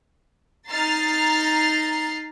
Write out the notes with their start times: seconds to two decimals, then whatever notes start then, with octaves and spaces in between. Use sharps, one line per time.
0.69 D#4 A#5 F6 A6 C7